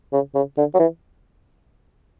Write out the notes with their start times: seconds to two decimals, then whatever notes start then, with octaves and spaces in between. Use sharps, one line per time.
0.13 C#3
0.35 C#3
0.57 D3
0.74 F#3
0.79 E3